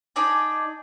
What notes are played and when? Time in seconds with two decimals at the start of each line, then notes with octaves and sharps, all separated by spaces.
0.16 D4 D#4 D5 G#5